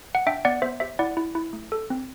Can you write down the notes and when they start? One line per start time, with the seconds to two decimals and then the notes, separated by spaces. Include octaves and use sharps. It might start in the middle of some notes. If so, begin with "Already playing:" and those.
0.15 F#5
0.27 D4 E5 G5
0.45 B3 D5 F#5
0.62 B3 C5 E5
0.80 G4 C5 E5
0.99 E4 D5 F#5
1.17 E4
1.35 E4
1.53 A3
1.72 A4
1.90 C4